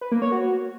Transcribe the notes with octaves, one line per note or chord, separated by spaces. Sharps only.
B4
A#3
C#5
F#4